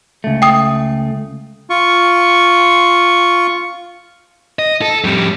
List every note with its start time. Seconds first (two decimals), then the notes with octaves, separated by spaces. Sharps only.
0.24 C#2 A3
0.42 G5 D#6
1.70 F4 C#6
4.59 D#5
4.82 A4
5.04 F2 G3